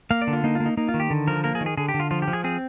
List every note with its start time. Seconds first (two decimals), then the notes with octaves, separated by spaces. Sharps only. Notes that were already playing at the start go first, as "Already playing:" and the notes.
0.11 A#3 F5
0.22 D5
0.27 D3
0.33 F4
0.44 A#3 D#4
0.55 F4
0.60 A#3
0.66 D#4
0.77 A#3 D#4
0.89 F4
0.94 D#3
1.00 G4
1.10 D3
1.27 F3 A#4
1.44 A#3 A#4
1.55 G#4
1.61 D#3
1.66 G#4
1.77 D3 G#4
1.89 G4
1.94 D3
2.00 F4
2.11 F3 F4
2.22 G4
2.28 F3
2.33 G#4
2.44 C4 G#4